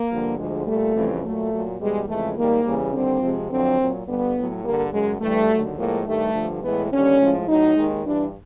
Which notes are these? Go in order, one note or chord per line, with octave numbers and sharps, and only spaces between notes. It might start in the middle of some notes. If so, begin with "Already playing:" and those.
Already playing: A#3
G2 D3 F3
D2 D3 F3 G#3
A#2 G3 A3
F2 C#3 E3 G3
A#2 F#3 A3
A#2 F#3
E2 B2 G3 G#3
F2 C#3 E3 G#3 A3
G#2 D#3 G3 A#3
E2 C#3 E3 G3
D#2 D3 G3 C4
F2 C3 F3 G#3
F2 D3 F#3 C4
A#2 F#3
G2 D3 G3 B3
A2 F#3
G2 D3 G3 A#3
F#2 C#3 F#3 G#3
G2 E3 G3 A3
D#2 D3 F#3
A2 F3 G#3 A#3
G2 D#3 G3 A3
G2 D3 F3
A2 E3 G#3 B3
D#2 D3 G3 C#4
A2 F3 G#3
A2 F#3 D#4
D#2 D#3 G#3
G2 E3 G3 D4